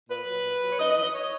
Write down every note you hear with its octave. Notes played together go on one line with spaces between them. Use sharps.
A#2 B4
F#3
A#2
F#3
C#5
F#2 D#5
D#5
E3
D#5
C#5